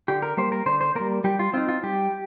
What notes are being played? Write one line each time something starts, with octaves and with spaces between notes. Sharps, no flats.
D3 G4
A#4
G3 A#3 C5
A#4
D3 C5
C5
G3 A#3 A#4
G3 G4
F4
C4 D#4 F4
F4
G3 G4